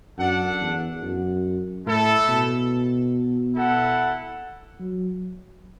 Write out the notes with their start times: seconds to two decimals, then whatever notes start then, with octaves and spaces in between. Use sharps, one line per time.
0.18 F#2 D4 A4 F#5
0.61 E2
1.02 F#2
1.86 A2 A3 E4 A4
2.28 B2
3.54 E4 A4 F#5
4.80 F#3